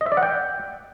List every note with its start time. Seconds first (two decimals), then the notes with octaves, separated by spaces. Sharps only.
0.01 D#5
0.06 E5
0.12 D5
0.17 F#5
0.23 G5